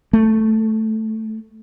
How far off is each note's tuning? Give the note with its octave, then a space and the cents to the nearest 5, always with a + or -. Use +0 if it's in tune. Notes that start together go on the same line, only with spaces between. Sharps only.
A3 +0